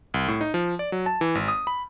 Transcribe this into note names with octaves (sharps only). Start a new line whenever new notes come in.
C2
A2
D#4
F3
D5
F#3
A5
E3
G#1
D#6
B5